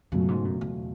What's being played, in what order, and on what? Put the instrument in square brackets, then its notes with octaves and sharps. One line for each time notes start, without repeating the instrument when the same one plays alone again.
[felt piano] C#2 B2 F#3 A3 [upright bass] F#2
[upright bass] G#2
F#2
E2